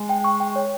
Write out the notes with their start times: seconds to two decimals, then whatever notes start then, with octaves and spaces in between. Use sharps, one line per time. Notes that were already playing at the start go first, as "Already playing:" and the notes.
Already playing: G#3
0.09 G5
0.24 C#6
0.40 G5
0.56 C#5